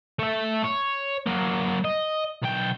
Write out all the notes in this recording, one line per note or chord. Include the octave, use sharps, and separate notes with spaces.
A3 E5
C#5
F#3 A#3
D#5
B1 G5